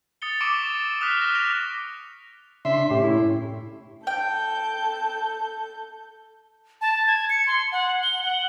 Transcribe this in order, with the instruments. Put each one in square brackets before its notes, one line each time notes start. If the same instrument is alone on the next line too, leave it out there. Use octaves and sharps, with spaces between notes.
[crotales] D#6 A6 C#7 G7
C#6 D6 E6 C#7 D7 E7
A6
D#6 F6 F#6 B6
F#6 A#6
F#6 A#6 B6 D7 F7
[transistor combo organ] C#3 D4 C6 [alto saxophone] E5
[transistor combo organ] A2 C#4 [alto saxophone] G4
[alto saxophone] E4
[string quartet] A4 G6 [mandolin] G5
[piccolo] A5
G#6
C#7
C6
F#5
G7
F#5